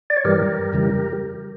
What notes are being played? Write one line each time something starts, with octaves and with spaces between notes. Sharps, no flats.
D5
C#5
G2 E3 G3 G4 A#4
F2 C#3 E3 G3